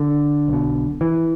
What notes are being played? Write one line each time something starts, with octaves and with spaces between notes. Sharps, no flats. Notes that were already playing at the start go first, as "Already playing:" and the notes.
Already playing: D3
B1 B2
E3